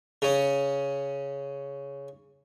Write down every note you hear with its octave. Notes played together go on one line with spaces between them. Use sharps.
C#3 C#4